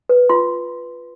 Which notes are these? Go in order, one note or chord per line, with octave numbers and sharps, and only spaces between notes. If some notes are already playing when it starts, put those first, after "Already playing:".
B4
F4 C6